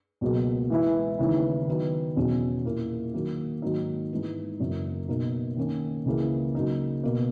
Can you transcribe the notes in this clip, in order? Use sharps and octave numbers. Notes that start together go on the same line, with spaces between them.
C#2 B2 F#3 A#3
E3 G#3 B3 E4
D#2 C#3 E3 B3 E4
D#3 F#3 B3 D#4
E2 B2 F#3 C#4
A#2 A#3 E4 A#4
D#3 F#3 A#3
G#2 D#3 F#3 A#3 D#4
G#2 E3 B3
F#2 C#3 E3 A#3
B2 A#3 D#4 A#4
D#3 A#3 C#4
C#2 C#3 E3 A#3
C#3 F#3 A#3 D#4
B2 A#3